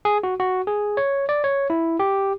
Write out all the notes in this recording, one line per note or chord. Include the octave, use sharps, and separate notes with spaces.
G#4
F#4
F#4
G#4
C#5
D5
C#5
E4
G4